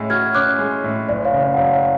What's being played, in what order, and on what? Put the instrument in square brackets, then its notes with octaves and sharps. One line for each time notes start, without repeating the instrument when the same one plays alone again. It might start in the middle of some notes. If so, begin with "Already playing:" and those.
Already playing: [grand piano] A2 G#3 C#4
[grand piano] F#4 [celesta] F6 G#6
[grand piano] C#4 [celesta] D6 F#6
[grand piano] G#3
A2
[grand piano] F#1 [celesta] D5
[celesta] C#5 F5
[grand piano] C#3
[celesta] D5
F#5
[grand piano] F#2 [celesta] C#5 F5
[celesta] C#5 F5